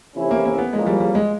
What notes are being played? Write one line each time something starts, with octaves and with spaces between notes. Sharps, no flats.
C3 E3 A3 C#4 E4
A#3
A#3
B3
E2 C#3 F3 G#3 A#3
G3
G3
G#3